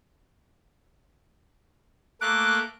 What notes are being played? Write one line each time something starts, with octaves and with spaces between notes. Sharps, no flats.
A3 A#3 D6 F#6